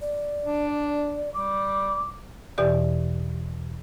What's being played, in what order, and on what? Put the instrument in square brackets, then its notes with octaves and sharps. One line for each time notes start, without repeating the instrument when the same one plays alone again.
[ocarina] D5
[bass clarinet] D4
[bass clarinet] G3 [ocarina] D6
[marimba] E2 B2 E3 G4 D5